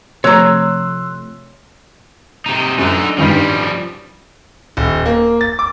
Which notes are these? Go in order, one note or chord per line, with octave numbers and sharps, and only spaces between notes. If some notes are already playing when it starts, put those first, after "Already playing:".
C3 F3 A3 C#5 A#5 C6 E6 F#6
C3 D#4
F#2 D3 D#4
G2 D#3 F3 G3 C#4
D#1
A#3
A6
D6